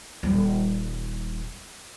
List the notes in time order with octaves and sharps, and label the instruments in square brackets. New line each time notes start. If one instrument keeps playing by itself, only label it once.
[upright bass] D#1 G3